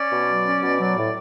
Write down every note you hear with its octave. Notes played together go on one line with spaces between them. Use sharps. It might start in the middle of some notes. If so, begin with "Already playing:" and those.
Already playing: C#4 D5
B2
F#3
C#4
B2
F#3
A2